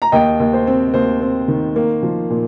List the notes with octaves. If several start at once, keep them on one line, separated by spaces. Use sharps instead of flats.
A#5
D#2 D#5 G5
D#2
C5
C4
D#2 C5
C4
D#3
A#3
F3
A#2